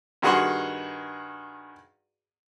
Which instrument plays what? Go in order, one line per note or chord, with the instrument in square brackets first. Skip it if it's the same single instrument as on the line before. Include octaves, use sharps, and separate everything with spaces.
[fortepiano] G2 D#3 F#4 G#4 F#5 C6